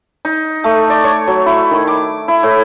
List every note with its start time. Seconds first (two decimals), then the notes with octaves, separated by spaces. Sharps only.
0.25 D#4
0.64 A3
0.90 D5
1.04 C#5
1.27 F#3
1.46 E4
1.71 D#3
1.87 D6
2.28 E4
2.43 A2